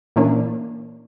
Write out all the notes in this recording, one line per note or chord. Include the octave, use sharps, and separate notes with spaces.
A#2 E3 A#3 C#4 D4